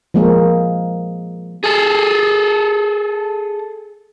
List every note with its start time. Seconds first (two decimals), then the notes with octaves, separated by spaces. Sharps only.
0.14 F3 G#3 A#3 G#4 A#4
1.64 G#4 A4